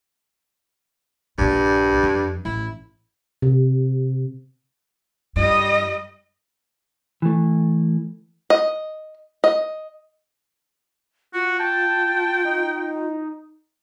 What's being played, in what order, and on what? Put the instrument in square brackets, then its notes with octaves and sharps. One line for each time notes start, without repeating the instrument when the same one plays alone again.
[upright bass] A#1 A#2 [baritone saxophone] G2
[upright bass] F2
[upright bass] A1 [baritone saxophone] E4
[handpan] C3
[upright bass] G2 [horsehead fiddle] G3 D#5
[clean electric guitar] E3 A3
[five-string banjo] D#5
D#5
[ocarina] F4 [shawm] F#4
[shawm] G5 [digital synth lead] A5
[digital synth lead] D#4